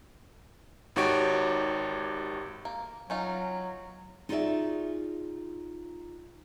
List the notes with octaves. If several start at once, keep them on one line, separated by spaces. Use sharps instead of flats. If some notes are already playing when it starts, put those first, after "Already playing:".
G#1 D#4 F#4 G4 C#5 D7
A#3
F#3 C#4 D#4 F4
D#4 F4 F#4 G#4 D5 E5